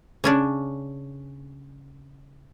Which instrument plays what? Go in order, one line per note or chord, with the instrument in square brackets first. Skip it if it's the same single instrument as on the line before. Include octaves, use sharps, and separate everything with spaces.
[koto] C#3 C#4 D4